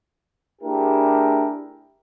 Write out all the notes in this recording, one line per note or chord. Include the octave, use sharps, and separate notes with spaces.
A3 D4 E4 G4 G#4 A#4